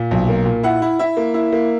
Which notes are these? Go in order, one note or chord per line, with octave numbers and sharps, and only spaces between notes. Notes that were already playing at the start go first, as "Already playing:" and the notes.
Already playing: A#2
B1
A#3
A#2
E4 F#5
E4
E4 E5
A#3
E4
A#3